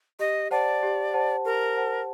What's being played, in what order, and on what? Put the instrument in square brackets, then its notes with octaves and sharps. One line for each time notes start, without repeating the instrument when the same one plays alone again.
[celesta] G4 [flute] D#5
[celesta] C5 F#5 A5 [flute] D5
[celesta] G4
C5 F#5 A5
[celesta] G4 [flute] A#4
[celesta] C5 F#5 A5